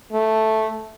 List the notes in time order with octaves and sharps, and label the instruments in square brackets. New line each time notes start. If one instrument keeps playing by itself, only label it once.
[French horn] A3